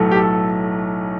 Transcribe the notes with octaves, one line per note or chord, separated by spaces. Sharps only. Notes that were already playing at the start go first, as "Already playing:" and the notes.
Already playing: B1 A2 F#3 A3
G4
A4